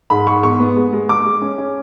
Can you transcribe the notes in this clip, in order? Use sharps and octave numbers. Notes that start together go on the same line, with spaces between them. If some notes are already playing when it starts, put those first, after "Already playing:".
G#2 B5
G#2 C#6
E2 C#6
B3
G#3
G#3
G#3 D6
G#3
C#4
C#4